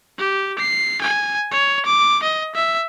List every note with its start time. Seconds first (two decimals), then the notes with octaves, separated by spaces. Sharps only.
0.18 G4
0.59 C7
1.01 G#5
1.51 C#5
1.86 D6
2.23 D#5
2.55 E5